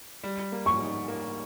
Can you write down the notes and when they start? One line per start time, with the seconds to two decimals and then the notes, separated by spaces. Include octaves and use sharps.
0.23 G3
0.52 A#3
0.66 C#6
0.81 D#4
1.08 A#3